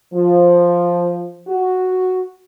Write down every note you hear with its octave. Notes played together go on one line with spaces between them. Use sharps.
F3
F#4